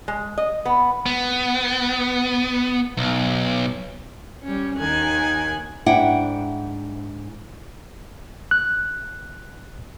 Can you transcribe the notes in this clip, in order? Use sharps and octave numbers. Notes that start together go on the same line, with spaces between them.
G#3
D#5
B3
B3
B1
G3 C#4
D#2 D#3 G#5 F#6
G#2 D4 E4 F#5 G5
F#6